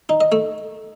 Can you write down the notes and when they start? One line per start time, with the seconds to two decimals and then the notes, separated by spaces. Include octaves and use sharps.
0.09 D#4
0.21 D#5
0.32 A3